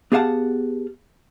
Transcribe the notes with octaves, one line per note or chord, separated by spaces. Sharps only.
B3 G4 G#4 F5 F#5 A5